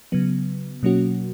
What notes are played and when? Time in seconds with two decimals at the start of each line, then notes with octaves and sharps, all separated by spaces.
0.12 C#3 F#3 B3
0.83 B2 F#3 A#3 C#4 F#4